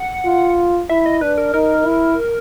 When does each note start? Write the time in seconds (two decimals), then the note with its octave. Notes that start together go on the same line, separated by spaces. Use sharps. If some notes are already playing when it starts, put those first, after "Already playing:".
Already playing: F#5
0.25 F4
0.89 E4 E5
1.06 D#5
1.21 D4 B4
1.38 A#4
1.54 D#4 A#4
1.86 E4